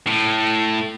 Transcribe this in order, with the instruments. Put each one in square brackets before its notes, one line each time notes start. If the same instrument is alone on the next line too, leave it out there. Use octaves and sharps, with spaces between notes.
[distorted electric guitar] A2